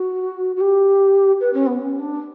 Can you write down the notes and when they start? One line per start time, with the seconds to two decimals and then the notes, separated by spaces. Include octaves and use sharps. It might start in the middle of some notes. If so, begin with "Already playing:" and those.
Already playing: F#4
0.56 F#4
0.60 G4
1.40 B4
1.54 C#4
1.67 B3
1.80 C#4
1.99 D4